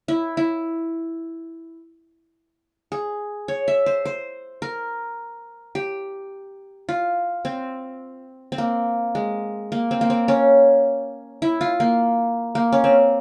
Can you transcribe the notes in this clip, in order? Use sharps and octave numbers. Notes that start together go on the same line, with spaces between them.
E4
E4
G#4
C#5
E5
C5
C5
A#4
G4
F4
C4
C4
A#3
G#3
A#3
C4
A#3
C4
C#4
E4
F4
A#3
A#3
C#4
C4